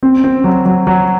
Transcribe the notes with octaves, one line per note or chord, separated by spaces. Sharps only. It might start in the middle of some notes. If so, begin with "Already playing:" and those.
C4
C4
F#3
F#3
F#3